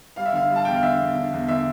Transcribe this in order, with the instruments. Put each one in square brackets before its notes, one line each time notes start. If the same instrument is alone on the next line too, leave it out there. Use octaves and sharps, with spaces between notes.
[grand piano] G3 F5
E5
D3 F5
G3
A5
E2 G5
F5
D3 E5
E2
D3
E2
D3 E5